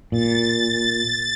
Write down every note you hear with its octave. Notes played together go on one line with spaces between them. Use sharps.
A#2 A6